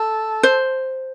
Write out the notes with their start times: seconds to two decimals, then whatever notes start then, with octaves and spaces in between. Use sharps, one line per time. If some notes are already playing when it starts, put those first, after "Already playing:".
Already playing: A4
0.43 C5